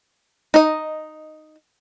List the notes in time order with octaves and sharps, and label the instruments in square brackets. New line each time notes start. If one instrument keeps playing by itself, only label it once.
[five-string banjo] D#4 D#5